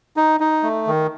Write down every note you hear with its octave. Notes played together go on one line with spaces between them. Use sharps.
D#4
D#4
A3
D#3